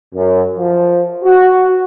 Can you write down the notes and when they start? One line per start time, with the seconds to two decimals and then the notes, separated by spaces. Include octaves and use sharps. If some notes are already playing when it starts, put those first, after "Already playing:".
0.14 F#2
0.57 F3
1.25 F#4